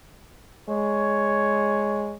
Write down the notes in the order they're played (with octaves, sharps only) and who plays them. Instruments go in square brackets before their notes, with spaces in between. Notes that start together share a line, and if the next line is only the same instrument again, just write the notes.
[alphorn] G#3 [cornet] C#5